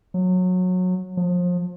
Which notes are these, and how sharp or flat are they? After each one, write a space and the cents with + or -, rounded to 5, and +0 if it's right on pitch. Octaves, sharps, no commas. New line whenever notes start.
F#3 -20
F3 +30